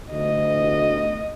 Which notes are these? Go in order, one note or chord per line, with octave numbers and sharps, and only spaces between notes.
D2 D#5